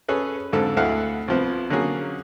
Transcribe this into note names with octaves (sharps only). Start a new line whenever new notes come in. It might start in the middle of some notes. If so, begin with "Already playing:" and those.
C#4 G#4 A4 B4
F2 G#2 D3 A4
D2 E4 A4 F5 F#5
C2 F3 B3
D3 F#3 A#3 C#4 G#4